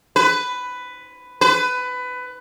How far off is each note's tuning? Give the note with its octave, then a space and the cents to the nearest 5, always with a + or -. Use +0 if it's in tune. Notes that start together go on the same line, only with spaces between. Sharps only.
B4 +10
B4 +20